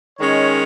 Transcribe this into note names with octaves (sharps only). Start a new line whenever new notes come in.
D#3 G#3 C#4 C#5